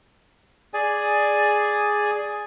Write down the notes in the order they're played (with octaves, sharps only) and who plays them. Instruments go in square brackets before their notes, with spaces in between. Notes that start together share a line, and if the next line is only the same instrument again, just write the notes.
[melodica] G#4 D5 G#5